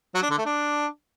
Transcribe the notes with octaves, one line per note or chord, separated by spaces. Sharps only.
F#3
D4
D3
A3
D4